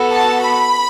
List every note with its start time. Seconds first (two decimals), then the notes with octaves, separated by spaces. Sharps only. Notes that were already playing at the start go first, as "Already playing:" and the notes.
Already playing: B3 F#4 A4
0.11 A5
0.40 B5